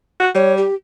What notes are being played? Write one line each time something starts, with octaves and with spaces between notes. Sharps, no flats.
F#4
G3 C#5
G4